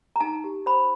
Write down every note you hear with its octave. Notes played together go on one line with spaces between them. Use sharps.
A#5
D#4 A5
G4
C5 B5